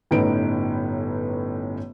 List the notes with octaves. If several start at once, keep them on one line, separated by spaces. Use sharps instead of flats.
G1 A2 C#4 D#4 B4 D7